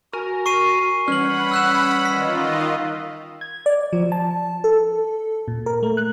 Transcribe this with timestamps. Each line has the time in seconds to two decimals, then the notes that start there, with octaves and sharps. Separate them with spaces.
0.13 F#4 A#4 G#5
0.46 C#6 C7 D#7
1.08 E3 G3 C#4 F#5 B5 F6 F#7
1.51 E6 F#6 E7
2.05 D#3 F4 D#5 B6
3.41 G#6
3.66 D5
3.93 F3
4.12 A5
4.64 A4
5.48 A#2
5.66 A#4
5.83 A3
5.97 F#6